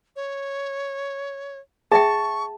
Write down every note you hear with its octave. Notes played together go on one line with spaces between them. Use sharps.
C#5
G#4 E5 G5 A5 C#6